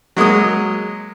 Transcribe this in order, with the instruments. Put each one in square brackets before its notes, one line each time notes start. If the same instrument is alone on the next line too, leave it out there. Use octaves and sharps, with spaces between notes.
[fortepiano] F#3 G#3 A#3 D#6